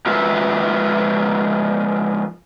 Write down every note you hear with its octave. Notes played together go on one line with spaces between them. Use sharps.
F3 G#3 F4 A#4 B4 E5